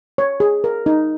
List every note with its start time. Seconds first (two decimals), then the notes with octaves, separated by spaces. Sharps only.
0.18 C#5
0.40 G#4
0.64 A#4
0.86 D#4